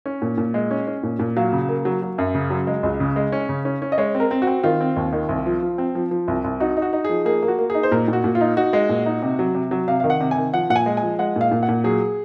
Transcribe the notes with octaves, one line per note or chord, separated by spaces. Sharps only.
C#4
A#2
A#2
G#3
C#4
C#4
A#2
A#2
F#3 F5
C#3
A#3
F#3
F#3
F#2
C#3
F#3
G#3
C#2
C#3
G#3
C#4
C#3
C#4
C#4
D#5
G#3 C#5
C4
A#4
C4
F#4
C4
D#3 F4
C4
D#2
D#3
C2
F3
F3
C4
F3
F3
C2
C2
D#4 F#4
D#4
F#4
D#4
F3 G#4
A#3 G#4
A#3
F#4
A#3
D#4 G#4
C5
A#2 A#4
A#2
F#4
A#2
F4
D#4
D#4 F#4
G#3
A#2
D#4
C3
F#3
C3
F#3
C3 F5
D#3 F5
F#5
C3
G#5
D#3
F3 F#5
A#2 F#5
G#5
G#3
G#5
F3
G#3 F#5
A#2 F5
A#2
F#5
A#2
F#3 G#4